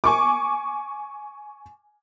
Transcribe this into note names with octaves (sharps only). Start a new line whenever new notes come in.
G#5 C#6 D6